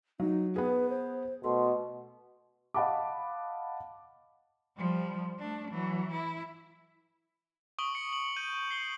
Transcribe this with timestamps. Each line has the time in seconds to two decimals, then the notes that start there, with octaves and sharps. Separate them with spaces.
0.20 F#3 D#4
0.56 B3 G#4 B4
0.90 C5
1.44 B2 A3 C6
2.74 D#5 F5 F#5 A5 B5 D6
4.77 F3 G3
5.39 A3 D4
5.71 E3 F#3
6.11 E4
7.79 C#6 D#6 D7 F#7 G7
7.95 C#7
8.13 F#7
8.37 G6 D#7
8.71 C7 G7